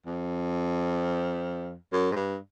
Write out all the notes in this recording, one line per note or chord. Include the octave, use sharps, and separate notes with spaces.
F2
F#2
G#2
G2